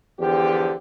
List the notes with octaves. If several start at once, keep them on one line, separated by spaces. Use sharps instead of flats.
E2 D3 F3 G4